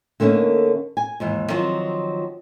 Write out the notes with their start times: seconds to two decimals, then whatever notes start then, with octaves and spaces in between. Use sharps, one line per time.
0.20 D3 A3 A#3 C#4 D#4
0.97 G#5
1.20 D#2 G#2 E3
1.49 D#3 F3 F#3 C4 F4